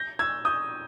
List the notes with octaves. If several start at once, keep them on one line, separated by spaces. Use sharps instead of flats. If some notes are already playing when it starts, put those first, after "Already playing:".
Already playing: G6 A#6
E6 G#6
D#6 G6